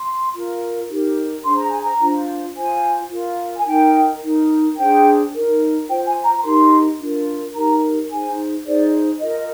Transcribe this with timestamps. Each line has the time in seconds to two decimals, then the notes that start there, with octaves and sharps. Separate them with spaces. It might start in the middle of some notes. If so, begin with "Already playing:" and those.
Already playing: C6
0.34 F4 A#4
0.89 D#4 G4 A#4
1.44 D4 G#4 C5 C6
1.56 A#5
1.69 G#5
1.82 A#5
2.01 D4 F4 C5
2.56 F4 C5 G#5
3.11 F4 A#4
3.56 G#5
3.66 D#4 A#4 G5
4.22 D#4 A#4
4.77 D4 G#4 C5 G5
5.33 D#4 A#4
5.88 F4 C5 G5
6.06 G#5
6.24 A#5
6.39 A#5
6.43 D#4 G4 A#4 C6
6.98 D4 F4 A#4
7.54 D#4 G4 A#4 A#5
8.10 D#4 G#4 C5 G#5
8.65 D#4 G#4 C5 D5
9.20 F4 A#4 D#5